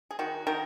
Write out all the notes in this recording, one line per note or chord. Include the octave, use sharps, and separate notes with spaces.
G#4
D#3 F#4
D#3 A#4